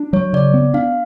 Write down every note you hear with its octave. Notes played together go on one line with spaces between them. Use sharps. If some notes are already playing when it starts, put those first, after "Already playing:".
Already playing: D4
F#3 C#5
C#3 D5
B3
D4 F5